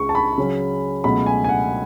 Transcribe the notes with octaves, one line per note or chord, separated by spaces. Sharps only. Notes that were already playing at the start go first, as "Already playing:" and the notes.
Already playing: C#2 C#3 G#3 C#6
A5
B5
C#3 F#3 C#4
C#2 B2 F#3 A3 B5
G#5
G#5
F#5